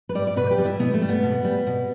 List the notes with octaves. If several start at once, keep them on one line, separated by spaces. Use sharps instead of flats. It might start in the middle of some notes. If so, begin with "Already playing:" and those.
B4
G3 D5
D5
B2 B4
G4
G3
E4
B2 B3
A3
G3
B3
B2
G3
B2